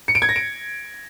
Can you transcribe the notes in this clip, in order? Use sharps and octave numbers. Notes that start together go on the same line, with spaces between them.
C#7
D7
G#6
A#6
D7